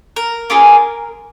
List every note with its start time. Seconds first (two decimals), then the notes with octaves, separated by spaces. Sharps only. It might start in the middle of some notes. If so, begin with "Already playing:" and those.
0.16 A#4
0.50 A#3 C#4 F4 G#4